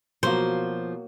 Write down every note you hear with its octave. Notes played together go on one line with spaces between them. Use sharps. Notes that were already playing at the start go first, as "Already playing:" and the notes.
B2 F3 F#3 A#3 C5